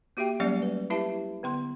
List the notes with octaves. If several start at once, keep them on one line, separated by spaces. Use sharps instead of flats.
A#3 F#4 G4 E5 G5
F#3 G3 A3 A#3 C#4 D5
B4
E4 G4 B4 E5 A5
D3 B3 C6